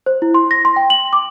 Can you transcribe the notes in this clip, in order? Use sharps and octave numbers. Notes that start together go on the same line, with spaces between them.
C5
E4
C6
A#6
C6
G5
F#7
D6